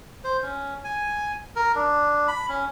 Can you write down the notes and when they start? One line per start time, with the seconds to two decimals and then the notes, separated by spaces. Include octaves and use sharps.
0.24 C5
0.42 C#4
0.84 G#5
1.56 A#4
1.75 D4
2.28 B5
2.49 C#4